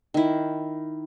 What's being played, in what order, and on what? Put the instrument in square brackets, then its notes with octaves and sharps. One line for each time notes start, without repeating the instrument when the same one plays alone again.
[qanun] D#3 E4